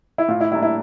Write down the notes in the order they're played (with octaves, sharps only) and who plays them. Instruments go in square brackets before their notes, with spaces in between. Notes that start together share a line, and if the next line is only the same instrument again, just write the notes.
[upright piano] E4
[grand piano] A2 [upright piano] F4
[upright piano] E4
[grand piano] G3 A#3 D4 [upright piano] E4
[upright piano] E4